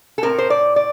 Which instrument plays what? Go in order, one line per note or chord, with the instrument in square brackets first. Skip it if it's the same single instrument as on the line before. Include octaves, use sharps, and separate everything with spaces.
[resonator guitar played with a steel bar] A4
A2 A3 C4 A#4
C5
D5
D5